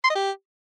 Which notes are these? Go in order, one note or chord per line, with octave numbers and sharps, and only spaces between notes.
C6
D#5
G4